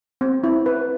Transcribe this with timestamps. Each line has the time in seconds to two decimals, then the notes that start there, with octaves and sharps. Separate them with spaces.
0.21 C4
0.44 E4
0.66 B4